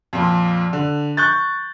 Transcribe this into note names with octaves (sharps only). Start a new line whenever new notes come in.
F2 A#2
D3
C#6 F#6 G6 A6